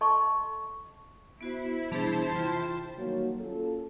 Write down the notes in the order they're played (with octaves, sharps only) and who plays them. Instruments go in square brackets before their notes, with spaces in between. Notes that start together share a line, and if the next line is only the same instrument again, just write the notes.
[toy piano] A4 D#5 A5 C6 C#6
[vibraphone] B3 F#4 C5 [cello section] E4
[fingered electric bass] B2 E3 G3 [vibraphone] B3 D4 G#4 [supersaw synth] C5 A5
[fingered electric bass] C3 E3 [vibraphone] F4 G5 C6
[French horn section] D#3 F#3 G3 A#3 F#4 C#5
A#3 C#4 F4 A4